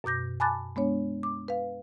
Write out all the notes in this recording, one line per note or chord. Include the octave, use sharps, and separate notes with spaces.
F#2 B2 D6 G6 A#6
G#5 A5 B5 D6 F#6 A6
G#3 B3 D4 C#5
D6
B4 F5